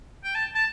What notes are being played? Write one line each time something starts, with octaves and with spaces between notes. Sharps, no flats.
G5
A5
A5